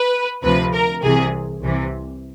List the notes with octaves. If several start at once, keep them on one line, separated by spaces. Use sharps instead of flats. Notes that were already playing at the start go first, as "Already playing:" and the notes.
Already playing: B4
D2 C3 F3 B4
A#4
C2 C3 E3 G#4
C2 C3 E3